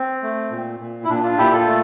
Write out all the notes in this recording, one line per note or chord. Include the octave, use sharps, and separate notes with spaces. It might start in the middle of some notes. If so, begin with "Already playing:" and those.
Already playing: C4
A3
A#2
A#2
E4
A#2 D4
D4 F4
A#2 E4 G4
F4 A4
A3